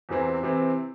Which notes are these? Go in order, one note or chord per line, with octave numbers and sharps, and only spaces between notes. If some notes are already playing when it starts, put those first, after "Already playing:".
E2 C3 E3 C4
C3 E3 C4